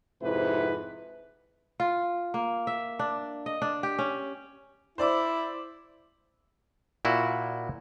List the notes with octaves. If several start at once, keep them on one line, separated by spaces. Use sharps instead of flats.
F2 G#2 C3 E4 B4
F4
A#3
E5
D4
D#5
D4
G4
C#4
E4 C5 D5 D6
A#2 E4 F#4